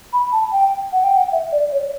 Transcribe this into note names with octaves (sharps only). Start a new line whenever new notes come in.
B5
A5
G5
F#5
G5
F#5
E5
D5
C#5